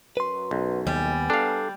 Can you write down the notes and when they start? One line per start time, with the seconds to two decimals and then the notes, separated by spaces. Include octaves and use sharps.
0.17 F#2 F#3 B4 C6
0.51 B1
0.87 D#2 G3 B3 G#5
1.30 D4 A4 F5